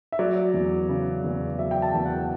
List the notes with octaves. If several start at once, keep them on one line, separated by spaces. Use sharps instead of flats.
E5
F#3 D5
E2
C#3
E2
F#3 E5
G5
A5
E2
F#5